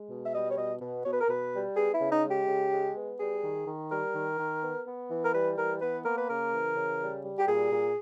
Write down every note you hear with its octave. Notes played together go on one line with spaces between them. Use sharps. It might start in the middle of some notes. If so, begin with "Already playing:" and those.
Already playing: G#3
B2
E5
G3 D#5
C#5
B2 D#5
B2
B2 C#5
B4
A#4
B2 B4
G3
B3 G#4
E4
C#3
D#4
G#3
G4
C#3
G#3
B3
G3 G#4
D#3
D#3
G3 A#4
D#3
D#3
B3
B3
E3
A#4
G3 B4
E3 A#4
B3 B4
A#3 A#4
B4
C#3 A#4
E3
C#3
G3
G3
G4
A#2 G#4
A#2